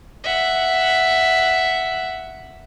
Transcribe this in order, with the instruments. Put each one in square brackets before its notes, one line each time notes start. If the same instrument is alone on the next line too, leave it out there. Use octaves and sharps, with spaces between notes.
[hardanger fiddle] E5 F#5